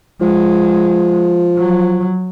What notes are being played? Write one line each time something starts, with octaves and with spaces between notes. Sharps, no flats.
F3 G#3
F#3